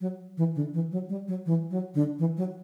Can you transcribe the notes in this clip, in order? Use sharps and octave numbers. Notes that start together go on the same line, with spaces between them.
F#3
E3
D3
E3
F#3
G3
F#3
E3
F#3
D3
E3
F#3